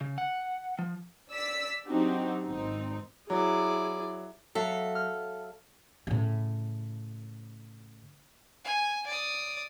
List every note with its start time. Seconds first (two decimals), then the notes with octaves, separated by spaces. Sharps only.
0.01 C#3
0.18 F#5
0.79 F3
1.30 D5 E6 B6
1.86 F#3 C4 D4 D#4 F#4 G4
2.44 G#1 C4 D#4
3.30 F#3 E4 G#4 D5
4.55 F#3 A4 E5 F5
4.95 F6
6.07 A2 C#3
8.64 G#5
9.07 D5 D#6